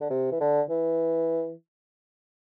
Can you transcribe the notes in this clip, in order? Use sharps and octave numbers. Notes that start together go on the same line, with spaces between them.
D3
C3
E3
D3
E3